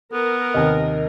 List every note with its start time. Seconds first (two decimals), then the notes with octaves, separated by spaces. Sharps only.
0.13 B3 A#4
0.54 D#2 C3 D#5